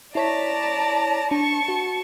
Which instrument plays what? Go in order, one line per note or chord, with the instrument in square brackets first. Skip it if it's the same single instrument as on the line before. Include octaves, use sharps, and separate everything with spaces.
[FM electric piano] E4 C#5 B6 [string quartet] D5 A5 A#5
[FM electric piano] D4 [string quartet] A5 C#6
[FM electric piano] F#4